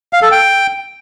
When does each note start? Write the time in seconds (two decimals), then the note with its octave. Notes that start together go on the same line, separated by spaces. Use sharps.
0.13 F5
0.22 A4
0.32 G5